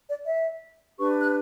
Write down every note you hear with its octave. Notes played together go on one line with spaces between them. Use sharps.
D5
E5
D4 G4 B4 C#6
F#6